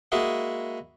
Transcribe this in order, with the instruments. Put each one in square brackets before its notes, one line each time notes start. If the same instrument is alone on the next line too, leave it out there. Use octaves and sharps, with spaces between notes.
[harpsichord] G#3 A#3 E4 F#4 G#4